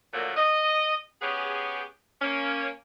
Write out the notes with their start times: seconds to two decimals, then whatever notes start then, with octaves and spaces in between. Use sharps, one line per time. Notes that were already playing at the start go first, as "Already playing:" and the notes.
0.13 A#2 D3 F3 F#3 A3 A#3
0.37 D#5
1.21 B3 C#4 G4 G#4
2.22 A#3 C#4